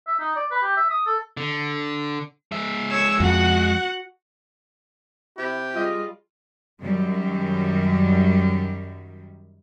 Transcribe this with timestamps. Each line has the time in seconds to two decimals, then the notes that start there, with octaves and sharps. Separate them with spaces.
0.07 E5
0.20 D#4
0.36 D5
0.51 B4
0.62 G4
0.77 E5
0.90 D#6
1.06 A4
1.37 D3
2.52 G#3 E5
2.91 C#5 E6
3.20 F2 F#4 F#5
5.38 C3 E4 G4
5.75 G3 F4 G#4 D#5
6.81 F#2 D#3 F#3 G3